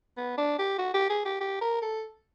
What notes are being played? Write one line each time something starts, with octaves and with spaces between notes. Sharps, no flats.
B3
D4
G4
F#4
G4
G#4
G4
G4
A#4
A4